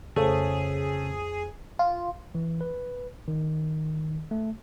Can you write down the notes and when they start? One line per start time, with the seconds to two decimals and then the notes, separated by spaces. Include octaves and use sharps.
0.16 F2 C#3 A3 G#4 C5
1.79 F4
2.35 E3
2.61 B4
3.28 D#3
4.31 A3